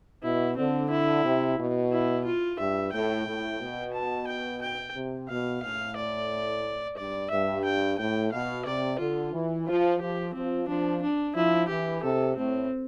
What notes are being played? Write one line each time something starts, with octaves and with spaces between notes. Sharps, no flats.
B2 E4
D3 C4
E4
C3
B2
E4
F4
G2 E5
A2 G5
A2
B2
A5
G5
G5
C3
B2 F5
A2 F5
D5
G2 D5
G2 E5
G5
A2 G5
B2 F5
C3 D5
D3 F4
E3
F3 F4
F3 G4
F3 C4
F3 D4
D4
F3 E4
E3 G4
C3 A4
A2 C4